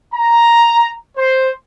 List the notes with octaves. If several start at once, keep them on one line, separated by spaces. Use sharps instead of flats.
A#5
C5